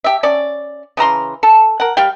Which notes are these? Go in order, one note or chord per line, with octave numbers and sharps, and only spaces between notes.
G4 E5
C#4 D5
C#3 E3 A#5 C6
A4
A#4 F#5
G3 G4 F5 G5